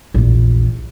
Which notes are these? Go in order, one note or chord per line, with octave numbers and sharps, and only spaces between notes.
A#1 E2